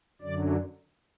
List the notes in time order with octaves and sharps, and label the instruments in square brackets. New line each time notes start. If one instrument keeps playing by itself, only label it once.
[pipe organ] F#2 D3 F#3 D5